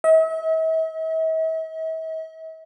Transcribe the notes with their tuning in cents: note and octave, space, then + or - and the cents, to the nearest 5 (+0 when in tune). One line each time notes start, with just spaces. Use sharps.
E5 -45